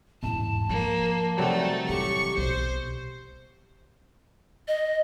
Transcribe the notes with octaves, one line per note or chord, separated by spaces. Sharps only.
E2 G#2 A5
F3 A#3
C3 F#3 G3 A3 D#4
E3 G4 C#6
B1 C5
D#5